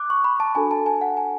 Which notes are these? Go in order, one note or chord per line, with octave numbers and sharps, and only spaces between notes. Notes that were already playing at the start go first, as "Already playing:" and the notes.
Already playing: D6 F#6
C#6
B5
A5
D4 F#4 A4 G#5
A5
G#5
F#5
G#5